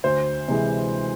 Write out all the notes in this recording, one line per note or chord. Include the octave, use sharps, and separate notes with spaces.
D2 C5
C3 E3 G#3